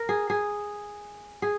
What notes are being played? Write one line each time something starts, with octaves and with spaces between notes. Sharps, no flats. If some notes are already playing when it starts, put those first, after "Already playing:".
Already playing: A#4
G#4
G#4
G#4